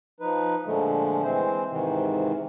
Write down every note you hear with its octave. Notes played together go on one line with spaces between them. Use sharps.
F3 D#4 B4
A#2 D3 F3 G#3 A3
E3 G#3 C4 C5
G#2 C3 D#3 E3